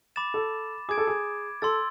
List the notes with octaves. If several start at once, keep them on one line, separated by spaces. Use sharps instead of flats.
B5 D6 A6 E7
A4
G#4 D6 G#6 D7
A4
G#4
A4 C6 E6 A6